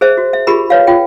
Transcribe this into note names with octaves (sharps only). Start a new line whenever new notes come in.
G#4 C5 E5
F#4
E5
F4 G4 G#4 A#4 B5
B4 C#5 F5
F4 G5